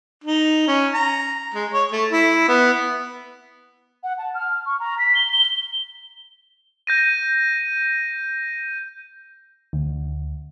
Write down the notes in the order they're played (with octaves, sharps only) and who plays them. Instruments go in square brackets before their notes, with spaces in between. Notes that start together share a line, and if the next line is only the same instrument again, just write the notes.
[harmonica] D#4
C#4
A#5
G#3
C#5
A3
E4
B3
[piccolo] F#5
A5
F6
C#6
A#5
B6
G7
G7
[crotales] G6 A#6 D#7
[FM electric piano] D2